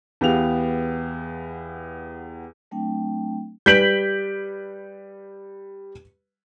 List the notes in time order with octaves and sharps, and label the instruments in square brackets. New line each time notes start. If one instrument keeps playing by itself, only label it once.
[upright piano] E2 B3 G4 F5 F7
[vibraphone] F#3 A3 C4 D4 G5
[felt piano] G3 B4 D7 [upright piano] G6 B6 F#7